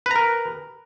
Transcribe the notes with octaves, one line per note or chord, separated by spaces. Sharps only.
A#4 B4 A#5